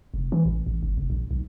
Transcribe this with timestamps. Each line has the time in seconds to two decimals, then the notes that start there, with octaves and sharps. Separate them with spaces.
0.14 F1
0.32 E3
0.45 A1
0.66 A1
0.83 G1
0.98 F1
1.10 A#1
1.31 B1